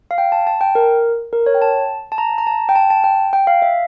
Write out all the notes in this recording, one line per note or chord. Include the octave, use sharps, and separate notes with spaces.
F5
G5
A5
A5
G5
A#4
A#4
C#5
G5
A5
A5
A#5
A#5
A5
G5
A5
A5
G5
G5
F5
E5